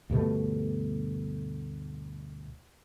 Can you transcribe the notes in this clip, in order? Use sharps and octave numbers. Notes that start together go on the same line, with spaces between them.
D2 G2 B2 A3